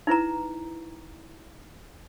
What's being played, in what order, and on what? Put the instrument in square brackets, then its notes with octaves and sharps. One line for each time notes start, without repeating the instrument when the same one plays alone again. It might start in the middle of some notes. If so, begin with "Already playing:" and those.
[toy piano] D#4 E4 B4 A#5